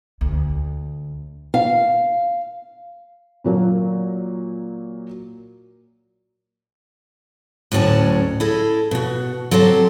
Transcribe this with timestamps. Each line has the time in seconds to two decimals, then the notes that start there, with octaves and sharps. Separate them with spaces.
0.21 D2
1.54 F5
3.44 A#2 F#3 A#3
7.72 D2 A2 F#3 C#4 D5 A5
8.40 E4 G#4 A4 D#5
8.91 B2 F#4
9.51 F#3 C4 G4 A4 C5